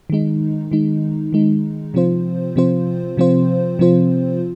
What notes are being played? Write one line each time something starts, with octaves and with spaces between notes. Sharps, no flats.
D#3 G#3 D#4
D#3 G#3 D#4
D#3 G#3 D#4
C3 F3 C4 F4 C5
C3 F3 C4 F4 C5
C3 F3 C4 F4 C5
C3 F3 C4 F4 C5